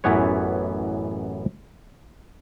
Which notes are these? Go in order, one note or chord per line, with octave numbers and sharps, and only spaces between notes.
A1 F#2 E3 B3 B4 C#5